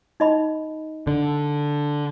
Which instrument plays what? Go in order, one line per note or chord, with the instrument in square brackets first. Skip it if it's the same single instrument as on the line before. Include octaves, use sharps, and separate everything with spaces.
[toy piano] D#4 D#5 B5
[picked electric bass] D3